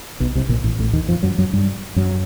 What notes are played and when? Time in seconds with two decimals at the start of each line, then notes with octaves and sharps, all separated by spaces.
0.20 B1 B2
0.35 C2 C3
0.49 A#1 A#2
0.64 A1 A2
0.79 A1 A2
0.93 D#2 D#3
1.08 F2 F3
1.23 F#2 F#3
1.38 F#2 F#3
1.53 G2 G3
1.96 F#2 F#3